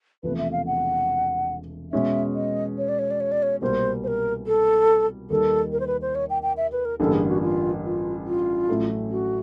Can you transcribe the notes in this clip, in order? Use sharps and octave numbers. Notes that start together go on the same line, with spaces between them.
E1 E2 C3 F3 A3 B4
E5
F5
F#5
B2 G#3 C#4 E5
D#5
C#5
D5
C#5
D5
C#5
D5
C#5
C2 B2 G3 A#3 C5
C5
A#4
A4
D#2 D#3 G3 A4
A#4
C5
B4
C5
C#5
G5
G5
E5
B4
A#4
A1 G2 D3 G3 A#3 A4
G#4
F#4
F4
F4
F4
A1 A2 F#3 A3 C#4
F#4